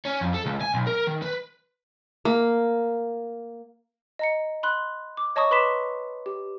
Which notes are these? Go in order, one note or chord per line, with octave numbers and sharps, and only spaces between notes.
C#4
F2
A4
C#2
G#5
B1
A#4
D#3
B4
A#3
D#5 A#5 C#7
B5 C6 F#6
D6
C#5 D#5 A5 A#5 C#6 D#6
B4 B5 C6 D6 B6 E7
G4